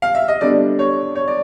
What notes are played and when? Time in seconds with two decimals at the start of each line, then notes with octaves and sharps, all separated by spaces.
0.02 F5
0.15 E5
0.28 D#5
0.41 D3 G3 B3 D4 D5
0.79 C#5
1.15 C#5
1.28 D5